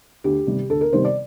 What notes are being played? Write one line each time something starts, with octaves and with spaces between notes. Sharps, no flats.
D2 G4
C3 D#3 G3
D2 A4
A#4
C3 D#3 G3 C5
D5